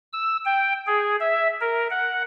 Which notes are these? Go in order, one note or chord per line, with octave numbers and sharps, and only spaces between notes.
E6
G5
G#4
E5
A#4
F#5